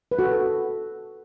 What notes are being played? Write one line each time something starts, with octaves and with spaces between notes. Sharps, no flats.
B4
F#4 A4